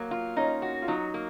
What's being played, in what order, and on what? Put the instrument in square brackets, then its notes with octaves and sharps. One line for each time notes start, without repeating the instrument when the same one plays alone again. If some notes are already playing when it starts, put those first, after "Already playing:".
Already playing: [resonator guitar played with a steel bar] F#3 [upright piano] A#3
[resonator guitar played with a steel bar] F4
[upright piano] C#4 [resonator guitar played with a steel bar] D#4
[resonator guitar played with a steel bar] F#4
[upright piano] F4
[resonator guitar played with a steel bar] F#3 [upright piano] D#4
[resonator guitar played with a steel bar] A#3